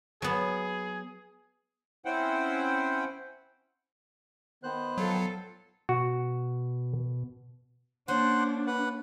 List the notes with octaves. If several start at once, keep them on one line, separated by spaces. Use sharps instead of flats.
F#3 B3 G#4
C4 C#4 E4 C5 F#5 G5
D#3 B3 C5 F#6
F#3 F4 A4
B2 F#4
A#3 C#4 D4 C5 F#5
B4 F#5